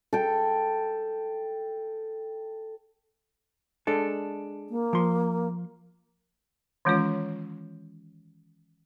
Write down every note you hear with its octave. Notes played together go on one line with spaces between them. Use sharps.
A4 G5
G#3 D4 A4
A#3
F3 C6
D#3 E3 G#3 C#4 F4 C#5